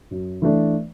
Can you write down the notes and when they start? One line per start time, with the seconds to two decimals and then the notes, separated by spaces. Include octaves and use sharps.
0.11 F#2
0.42 E3 A3 D4